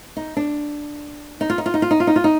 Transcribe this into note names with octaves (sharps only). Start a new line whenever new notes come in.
D#4
D4
D#4
F4
D#4
F4
D#4
F4
D#4
F4
D#4
F4
D#4